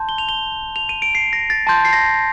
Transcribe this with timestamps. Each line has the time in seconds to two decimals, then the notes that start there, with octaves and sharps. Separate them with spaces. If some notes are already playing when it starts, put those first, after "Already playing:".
Already playing: A5 C6 G6
0.09 G7
0.18 F7
0.29 G7
0.76 F7
0.89 D#7
1.02 D7
1.15 C7
1.33 A#6
1.50 A6
1.67 A5 C6 G6
1.85 C7
1.93 A#6